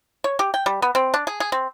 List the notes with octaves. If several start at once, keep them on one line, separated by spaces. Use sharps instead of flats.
C#5
G4
G5
G3
B3
C4
D4
G#4
G#4
C4